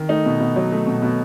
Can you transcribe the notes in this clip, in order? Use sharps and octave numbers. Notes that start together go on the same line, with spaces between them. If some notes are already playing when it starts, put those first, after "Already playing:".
Already playing: D#3
A3 D#4
B2
B2
F#3
A3
B2
B2